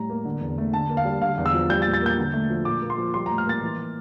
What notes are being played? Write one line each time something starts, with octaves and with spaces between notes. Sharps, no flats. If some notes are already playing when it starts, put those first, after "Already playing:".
Already playing: A2 G3 A#5
A#3
D3
E2
A3
D3 A5
A#3
F5
G3
D3 F5
E2
E6
F3
G3 G6
A6
A#2
A6
A#3 G6
D3
A3
F3
A#2 D6
A#3
C6
F3
G3 C6
A2 A#5
F6
A#3 A6
E3